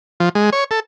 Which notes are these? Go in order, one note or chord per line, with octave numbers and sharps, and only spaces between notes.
F3
G#3
C#5
A4